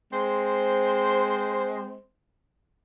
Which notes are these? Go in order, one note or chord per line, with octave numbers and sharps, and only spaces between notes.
G#3 C4 C5